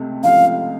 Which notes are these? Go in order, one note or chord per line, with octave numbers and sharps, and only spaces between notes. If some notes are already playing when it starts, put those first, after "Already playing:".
Already playing: C#2 C3 A3
C#2 C3 F3 A3 F5